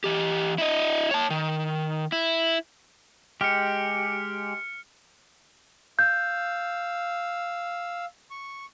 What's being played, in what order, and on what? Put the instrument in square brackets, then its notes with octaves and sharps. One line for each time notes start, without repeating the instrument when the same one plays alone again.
[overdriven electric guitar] E3 G4
E4 D#5
C#5 A5
D#3
E4
[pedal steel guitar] G#3 G4 [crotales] F6 C#7
[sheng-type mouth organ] F5 E6 [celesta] G6
[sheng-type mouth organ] C#6